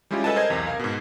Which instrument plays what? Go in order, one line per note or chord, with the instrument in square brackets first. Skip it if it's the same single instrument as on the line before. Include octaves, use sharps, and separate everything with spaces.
[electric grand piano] G3 G#3 C#4 E4 F4 G4
A4 B4 D#5 G#5 A5
A#4 C5 D#5 A5 G#6
B1 E2 C3
A#4 F5
G#2 B2